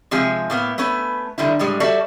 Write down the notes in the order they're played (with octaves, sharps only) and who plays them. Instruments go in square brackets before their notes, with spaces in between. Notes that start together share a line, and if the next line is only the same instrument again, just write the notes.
[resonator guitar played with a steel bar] C3 F3 G#3 G#4
A2 A#3 B3
A3 B3 C#4 B4
D3 D#3 G3 E4
A2 G3 G#3
G3 F#4 A4 D5 E5